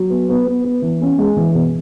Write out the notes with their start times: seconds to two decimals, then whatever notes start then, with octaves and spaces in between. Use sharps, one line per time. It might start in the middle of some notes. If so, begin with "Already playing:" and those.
Already playing: F#3
0.10 B3
0.29 B3
0.47 B3
0.64 B3
0.82 E3
1.01 C#4
1.18 G#3
1.37 E3
1.55 B2